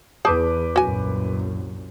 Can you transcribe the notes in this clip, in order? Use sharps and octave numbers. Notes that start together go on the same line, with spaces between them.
E2 G#4 B4 A5 D6 G6
C2 F#2 A#2 F#4 G#5